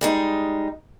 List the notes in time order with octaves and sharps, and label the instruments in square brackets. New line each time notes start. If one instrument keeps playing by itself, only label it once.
[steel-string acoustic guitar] G3 G#3 D#4